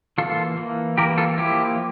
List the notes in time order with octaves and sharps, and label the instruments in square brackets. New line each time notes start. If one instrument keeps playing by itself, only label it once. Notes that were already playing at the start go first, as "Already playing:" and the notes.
[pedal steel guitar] E3 A#3 F4 A4
E3 A#3
E3 A#3 G4 A#4
F4 A4
F3 A#3 E4 G4